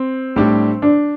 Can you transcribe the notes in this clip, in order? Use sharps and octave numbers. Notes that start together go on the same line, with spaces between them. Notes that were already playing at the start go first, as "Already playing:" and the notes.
Already playing: C4
A2 G3 D4 G4
D4